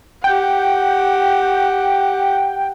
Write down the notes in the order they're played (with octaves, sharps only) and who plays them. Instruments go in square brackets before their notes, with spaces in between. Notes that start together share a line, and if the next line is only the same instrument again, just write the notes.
[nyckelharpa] G4 F#5 [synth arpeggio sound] G5